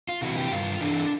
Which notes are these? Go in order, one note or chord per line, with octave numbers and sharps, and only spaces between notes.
F4
C3 E3 F#4
G4
G2 F4
E3 D4